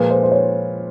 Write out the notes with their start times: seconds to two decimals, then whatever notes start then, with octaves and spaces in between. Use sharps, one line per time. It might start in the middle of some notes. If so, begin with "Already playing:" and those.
Already playing: A#2 F3 G#3 B4
0.11 C5
0.23 C5
0.31 C#5